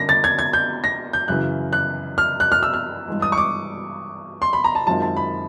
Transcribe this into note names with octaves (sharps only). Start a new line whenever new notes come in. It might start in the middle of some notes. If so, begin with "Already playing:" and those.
Already playing: D3 G3 A#3 C#4 A#6
A6
G#6
G#6
G6
A#6
G6
F#2 C#3 E3 F#6
F#6
F6
F#6
F6
E6
F6
G2 E3 G#3
D#6
C#6
D6
C6
B5
A#5
A5
F#2 D#3 G#3 C4 F4 A5
A5
B5